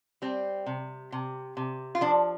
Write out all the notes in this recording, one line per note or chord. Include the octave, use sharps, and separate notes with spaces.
G3 C4
C3
C3
C3
F4
F3 D4